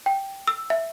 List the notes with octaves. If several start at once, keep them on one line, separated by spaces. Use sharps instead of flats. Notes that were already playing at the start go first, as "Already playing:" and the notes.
G5
E6
E5